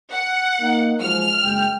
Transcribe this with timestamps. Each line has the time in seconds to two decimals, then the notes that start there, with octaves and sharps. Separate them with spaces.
0.11 F#5
0.61 A#3 D#4
1.01 F3 F#3 G#3 F6
1.44 F#1 G#3 G5